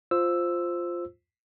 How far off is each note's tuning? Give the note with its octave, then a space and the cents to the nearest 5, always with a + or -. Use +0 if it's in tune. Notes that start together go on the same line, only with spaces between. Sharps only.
F4 +0 C5 +0 E6 +0